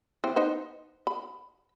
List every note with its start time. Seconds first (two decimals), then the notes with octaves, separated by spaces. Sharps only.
0.24 E3 C4
0.36 D#4 B4 C5
1.07 B5